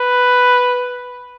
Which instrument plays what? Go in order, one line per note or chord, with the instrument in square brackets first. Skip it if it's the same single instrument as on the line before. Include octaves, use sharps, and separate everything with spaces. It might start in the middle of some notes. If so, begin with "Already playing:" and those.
Already playing: [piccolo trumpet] B4